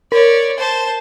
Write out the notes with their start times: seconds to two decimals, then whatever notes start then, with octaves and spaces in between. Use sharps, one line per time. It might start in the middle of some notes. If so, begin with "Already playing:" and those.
0.12 A#4 C#5 D5
0.58 C5 A5